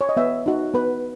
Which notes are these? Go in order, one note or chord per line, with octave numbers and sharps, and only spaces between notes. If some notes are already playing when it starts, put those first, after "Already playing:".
C#5
D#5
B3 E5
D#4 F#4
B3 B4